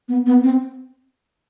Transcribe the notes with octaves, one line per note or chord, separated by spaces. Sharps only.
B3
B3
C4